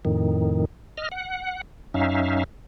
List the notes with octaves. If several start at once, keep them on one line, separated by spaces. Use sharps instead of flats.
F2 A2 D#3
D#5 F6
F#5
F#2 C#4 D#4 E5 F5